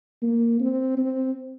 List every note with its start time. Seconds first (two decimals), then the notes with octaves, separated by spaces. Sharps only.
0.22 A#3
0.60 C4
0.98 C4